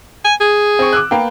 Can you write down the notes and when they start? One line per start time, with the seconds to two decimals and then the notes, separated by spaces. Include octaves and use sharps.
0.25 G#5
0.40 G#4
0.79 C4 C#6
0.93 D6 E6 F#6
1.11 A#3 B3 G5